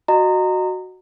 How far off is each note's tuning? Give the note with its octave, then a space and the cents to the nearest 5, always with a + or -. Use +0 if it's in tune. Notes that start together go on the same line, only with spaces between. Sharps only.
F#4 +0 D#5 -20 A#5 -20